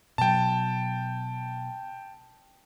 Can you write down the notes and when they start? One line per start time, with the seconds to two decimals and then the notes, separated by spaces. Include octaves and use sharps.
0.18 B2 F#3 G5 A5